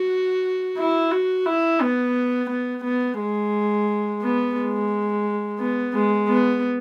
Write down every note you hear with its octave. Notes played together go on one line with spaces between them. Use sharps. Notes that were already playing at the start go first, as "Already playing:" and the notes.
Already playing: F#4
E4
F#4
E4
B3
B3
B3
G#3
B3
G#3
B3
G#3
B3